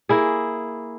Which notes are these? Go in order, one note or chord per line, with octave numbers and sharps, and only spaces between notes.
A#3 E4 G#4